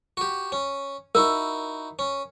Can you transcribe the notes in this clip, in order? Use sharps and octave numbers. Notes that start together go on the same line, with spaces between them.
F#4 G4
C#4
D#4 E4 F#4 A#4
C#4